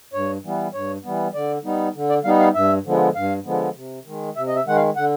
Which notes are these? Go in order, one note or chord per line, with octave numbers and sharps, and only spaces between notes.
G2 C#5
E3 G3 B3
G2 C#5
E3 G3 B3
D3 D5
G3 B3 D#4
D3
D5
G3 B3 D#4 F5
F5
G2 E5
D3 F3 G#3 B3
G2 F5
D3 F3 G#3 B3
C3
D#3 G#3
C3 E5
D#5
E5
D#3 G#3 F#5
F5
D3 F#5